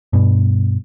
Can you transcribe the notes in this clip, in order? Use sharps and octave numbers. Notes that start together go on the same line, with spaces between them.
G2 B2